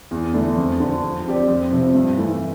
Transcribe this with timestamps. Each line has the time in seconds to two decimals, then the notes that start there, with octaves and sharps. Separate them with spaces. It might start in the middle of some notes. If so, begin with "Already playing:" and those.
0.11 E2
0.34 D3 A3 E4
0.56 F2
0.80 D3 F3
1.02 F3
1.25 C4 G4 D5
1.48 F2
1.72 C3 F3
1.95 G2
2.17 E3 A3 E4